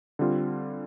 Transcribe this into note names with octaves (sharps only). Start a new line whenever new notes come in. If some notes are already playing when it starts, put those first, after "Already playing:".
D3 G3 C4 F4